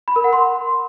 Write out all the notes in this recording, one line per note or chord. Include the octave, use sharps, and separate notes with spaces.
B5
A#4
F#5
C6